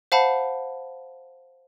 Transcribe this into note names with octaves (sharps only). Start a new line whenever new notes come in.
C5 F5 F#5 A5 B5